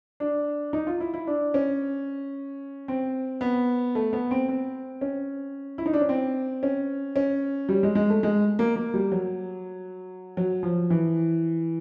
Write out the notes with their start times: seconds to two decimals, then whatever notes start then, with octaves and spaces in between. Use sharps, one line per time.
0.20 D4
0.73 D#4
0.87 F4
1.00 E4
1.14 E4
1.27 D4
1.54 C#4
2.88 C4
3.41 B3
3.95 A3
4.13 B3
4.31 C4
4.49 C4
5.01 C#4
5.78 E4
5.86 D#4
5.93 D4
6.01 C#4
6.09 C4
6.63 C#4
7.16 C#4
7.69 G3
7.83 G#3
7.95 G#3
8.10 A3
8.23 G#3
8.59 A#3
8.76 A#3
8.94 G3
9.12 F#3
10.37 F#3
10.63 F3
10.90 E3